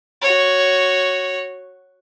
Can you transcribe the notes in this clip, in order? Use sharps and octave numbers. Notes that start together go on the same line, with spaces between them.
F#4 C#5